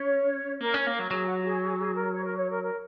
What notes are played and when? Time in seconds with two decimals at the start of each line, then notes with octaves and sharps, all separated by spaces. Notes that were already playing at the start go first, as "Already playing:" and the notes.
Already playing: C#4 C#5
0.60 A#3 A#4
0.74 C#4 C#5
0.87 A#3
0.94 F#3 A#4
1.11 F#3 G#4
1.27 F#4
1.39 F#4
1.45 G#4
1.62 G#4
1.78 G#4
1.95 A#4
2.13 C#5
2.25 A#4
2.37 C#5
2.50 A#4
2.62 A#4